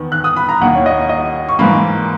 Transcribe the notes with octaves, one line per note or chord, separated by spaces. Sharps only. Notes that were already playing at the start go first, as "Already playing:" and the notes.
Already playing: E2 D#3 B3
F#6
D#6
B5
A#5
D#2 D#3 A#3 F#5
C#5
D#5
D#5
C#6
G#2 E3 A#3 B5